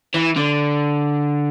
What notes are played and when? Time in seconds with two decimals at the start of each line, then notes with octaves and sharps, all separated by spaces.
0.14 E3
0.36 D3